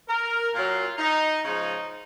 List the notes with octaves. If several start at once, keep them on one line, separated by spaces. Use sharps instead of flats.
A#4
A#2 F#3 F4
D#4
C#3 F3 G#3 D#4